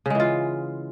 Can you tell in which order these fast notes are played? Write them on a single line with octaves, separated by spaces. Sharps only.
C#3 G#3 E3 F4